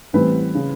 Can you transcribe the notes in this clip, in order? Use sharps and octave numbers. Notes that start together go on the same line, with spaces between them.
A1 A2 E3 G3 C4 B4
C#3